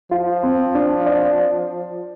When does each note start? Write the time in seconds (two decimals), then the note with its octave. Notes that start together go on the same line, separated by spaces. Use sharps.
0.11 F3 F4
0.43 C4
0.75 D4
1.06 D5